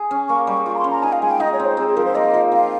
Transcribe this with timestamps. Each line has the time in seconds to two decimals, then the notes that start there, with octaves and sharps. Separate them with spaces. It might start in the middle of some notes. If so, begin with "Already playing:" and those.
Already playing: G#4
0.11 C#4
0.28 A#3 C#6
0.47 G3 C#6
0.66 F4 C#6
0.74 A#5
0.78 C6
0.84 C#4
0.91 A#5
1.03 D#4 G#5
1.13 F5
1.22 G#3 G#5
1.31 G5
1.40 D#4 D#5
1.53 C#5
1.60 C4
1.65 C5
1.77 C4 G#4
1.87 G#4
1.96 F3 A#4
2.05 C5
2.15 A#3 D#5
2.34 F3
2.52 C4 F5